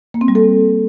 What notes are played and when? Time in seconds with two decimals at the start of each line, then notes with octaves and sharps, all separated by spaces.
0.14 A#3
0.21 C4
0.28 G3
0.35 A4